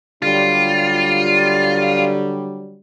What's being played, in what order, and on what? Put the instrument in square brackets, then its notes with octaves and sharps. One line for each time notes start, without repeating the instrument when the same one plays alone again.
[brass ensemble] D3 F#3 G3 [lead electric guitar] F4